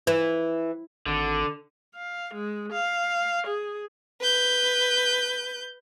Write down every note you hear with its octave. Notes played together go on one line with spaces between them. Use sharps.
E3
G#1 D3
F5
G#3
F5
G#4
B4 G6